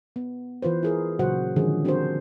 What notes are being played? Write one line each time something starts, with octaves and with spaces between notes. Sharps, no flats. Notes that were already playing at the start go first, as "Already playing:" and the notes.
B3
E3 F4 B4 C5
E4 G#4 A#4
A#2 C#3 F#3 F#4 C5 F#5
D3 D#3 F3 G#3 C#4 G#4
C4 D4 F#4 G4 A#4 C5